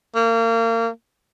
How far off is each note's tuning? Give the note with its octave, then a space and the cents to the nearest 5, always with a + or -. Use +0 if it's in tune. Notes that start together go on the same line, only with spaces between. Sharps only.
A#3 -30